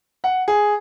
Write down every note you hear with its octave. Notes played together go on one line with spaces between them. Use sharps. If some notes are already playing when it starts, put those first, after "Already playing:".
F#5
G#4